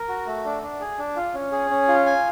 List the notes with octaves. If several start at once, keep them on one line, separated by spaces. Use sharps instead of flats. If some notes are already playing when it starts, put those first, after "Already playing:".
Already playing: A#4
F#4
A3
D4
D4
G#4
D4
F4
C#4
G#4
C#4
F4
G#5